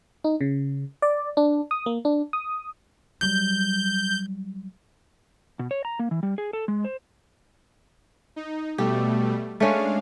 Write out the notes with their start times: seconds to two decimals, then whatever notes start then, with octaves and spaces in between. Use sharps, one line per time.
0.24 D#4
0.41 C#3
1.02 D5
1.37 D4
1.71 D#6
1.86 A#3
2.05 D4
2.33 D#6
3.21 F#3 G3 G6
5.59 B2
5.71 C#5
5.85 A#5
5.99 A#3
6.11 E3
6.23 G3
6.38 G#4
6.53 A4
6.68 G#3
6.84 C5
8.36 D#4
8.78 B2 G3 A3 G4
9.60 G#3 A3 C#4 D4 F5